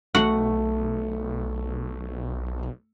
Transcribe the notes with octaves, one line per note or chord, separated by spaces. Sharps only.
B1 A3 F#4 F#5